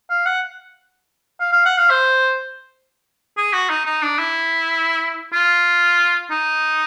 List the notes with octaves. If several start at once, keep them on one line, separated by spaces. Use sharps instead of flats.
F5
F#5
F5
F5
F#5
F5
C5
G#4
F#4
D#4
D#4
D4
E4
F4
D#4